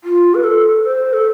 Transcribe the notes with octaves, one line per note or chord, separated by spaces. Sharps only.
F4
B4
A4
C5
A4